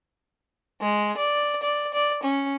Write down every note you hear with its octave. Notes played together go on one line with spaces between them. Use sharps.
G#3
D5
D5
D5
C#4